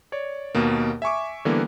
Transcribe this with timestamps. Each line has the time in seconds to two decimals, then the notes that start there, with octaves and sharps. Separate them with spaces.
0.12 C#5 D5
0.55 D#2 B2 A#3
1.02 E5 G#5 C#6 D6
1.45 D3 E3 G3 A#3 B3